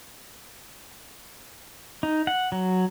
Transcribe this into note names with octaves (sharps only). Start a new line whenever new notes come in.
D#4
F#5
F#3